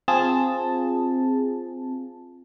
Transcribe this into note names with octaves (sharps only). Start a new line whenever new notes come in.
C4 F4 G#4 A5